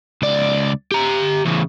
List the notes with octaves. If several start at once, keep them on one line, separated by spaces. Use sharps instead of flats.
C#2 D5
G4 A#5
E2 C#3